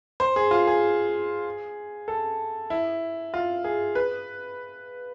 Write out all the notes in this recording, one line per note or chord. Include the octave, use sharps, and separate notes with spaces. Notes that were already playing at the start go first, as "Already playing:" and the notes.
C5
G#4
F4
G#4
A4
E4
F4
G#4
B4